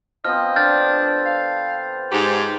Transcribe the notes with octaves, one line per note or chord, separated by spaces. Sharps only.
F3 B3 C4 D#5 F6
D3 D4 F6 G6 A6
F5
G#2 G4